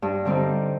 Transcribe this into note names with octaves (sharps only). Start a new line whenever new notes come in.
G2
D3 G3 C4 D#4